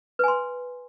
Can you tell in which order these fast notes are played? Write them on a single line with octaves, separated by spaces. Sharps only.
B4 G#5 C6